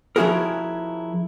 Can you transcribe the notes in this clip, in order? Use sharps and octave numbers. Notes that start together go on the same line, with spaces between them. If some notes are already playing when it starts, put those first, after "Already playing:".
F3 C#4 E4 F#4 G#4 A#4